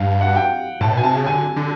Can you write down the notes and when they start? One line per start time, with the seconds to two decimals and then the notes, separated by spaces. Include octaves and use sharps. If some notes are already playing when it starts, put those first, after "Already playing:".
Already playing: G2 F5
0.21 F#5
0.36 G5
0.80 A2 A5
0.92 B2
0.97 G#5
1.03 C3 A5
1.15 C#3
1.26 D3 G#5
1.56 D3